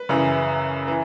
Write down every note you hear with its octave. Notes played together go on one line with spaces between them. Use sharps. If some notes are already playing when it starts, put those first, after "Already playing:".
Already playing: B4
F#2 C#3 E3
E3